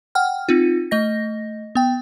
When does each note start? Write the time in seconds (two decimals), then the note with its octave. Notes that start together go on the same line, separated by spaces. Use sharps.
0.15 F#5 G5 F6
0.49 C4 D#4 F4
0.91 A3 D#5 A#6
1.75 B3 G5